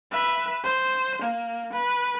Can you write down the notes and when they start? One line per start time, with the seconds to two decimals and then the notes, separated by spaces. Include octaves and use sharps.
0.12 B4 E5
0.63 C5
1.22 A#3
1.73 B4